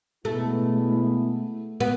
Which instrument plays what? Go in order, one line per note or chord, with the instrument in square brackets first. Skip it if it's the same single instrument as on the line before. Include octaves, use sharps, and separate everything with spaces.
[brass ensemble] B2 G#3 B3 E4 [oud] A3
[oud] B3